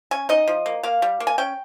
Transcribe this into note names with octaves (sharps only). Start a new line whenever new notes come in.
C#4 G#5
D#4 D#5
F3
A#3
A#3 F5
G3
A#3
G#5
C#4 G5